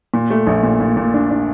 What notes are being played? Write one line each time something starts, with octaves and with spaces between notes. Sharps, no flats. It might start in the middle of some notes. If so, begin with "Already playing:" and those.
A#2
A3
A#1
A#2
A#2
A#2
D4
D4